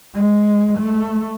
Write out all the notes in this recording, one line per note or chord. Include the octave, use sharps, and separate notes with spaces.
G#3
A3